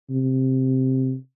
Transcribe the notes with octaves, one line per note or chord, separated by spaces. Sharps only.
C3